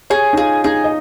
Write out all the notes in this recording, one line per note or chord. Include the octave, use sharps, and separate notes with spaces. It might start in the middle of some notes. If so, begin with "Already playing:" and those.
G#4 C#5
D#4
F4 G#4
D#4 G#4
D#5